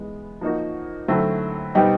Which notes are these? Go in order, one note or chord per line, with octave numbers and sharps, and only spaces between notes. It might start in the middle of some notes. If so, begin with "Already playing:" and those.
Already playing: E3 G#3 B3
F3 A#3 D#4 F#4
D3 F#3 A3 C4 E4
B2 G3 C4 D#4 G4